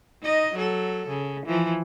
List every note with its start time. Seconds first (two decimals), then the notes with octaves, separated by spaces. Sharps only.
0.23 D#4 D#5
0.54 F#3 A4
1.08 C#3
1.46 E3 F3